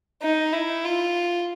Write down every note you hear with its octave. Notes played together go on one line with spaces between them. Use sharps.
D#4
E4
F4